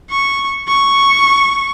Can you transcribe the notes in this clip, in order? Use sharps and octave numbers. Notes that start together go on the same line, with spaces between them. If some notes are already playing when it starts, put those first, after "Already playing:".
C#6
C#6